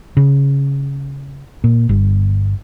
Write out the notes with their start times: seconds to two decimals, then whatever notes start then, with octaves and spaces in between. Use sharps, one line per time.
0.17 C#3
1.64 A#2
1.89 G1